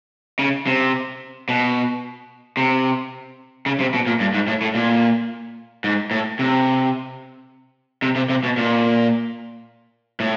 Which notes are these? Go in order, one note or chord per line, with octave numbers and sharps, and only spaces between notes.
C#3
C3
B2
C3
C#3
C3
B2
A#2
G2
G#2
A2
A2
A#2
G#2
A2
C3
C3
C3
C3
B2
A#2
A2